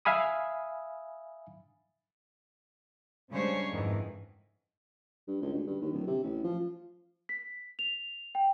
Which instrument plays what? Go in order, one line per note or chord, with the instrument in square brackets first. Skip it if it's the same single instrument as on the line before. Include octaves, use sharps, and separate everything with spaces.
[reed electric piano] E5 F5 G#5 B5 D#6
[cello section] C#3 G3 G#3 D4 C5 C#5
F2 G#2 D#3 E3
[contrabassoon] G2
C#2
D2
G2
D#2
D1
C3
A1
F3
[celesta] B6
F7
G5